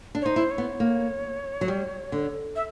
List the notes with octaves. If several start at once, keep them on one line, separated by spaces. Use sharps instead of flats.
D4
C#5
D#4 C5
E4
C#5
B3
A#3
F#3
G3
D3
E5